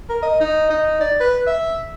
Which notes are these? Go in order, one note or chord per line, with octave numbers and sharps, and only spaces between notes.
A#4
D#5
D#4
D#4
D5
B4
E5